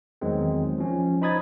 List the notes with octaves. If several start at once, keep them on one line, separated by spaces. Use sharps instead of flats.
E2 D#3 F#3 G#3 C4
F3 C#4
D#4 C5 B5 D#6 G#6 A6